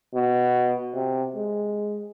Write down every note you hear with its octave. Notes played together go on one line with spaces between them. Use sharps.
B2
C3
G#3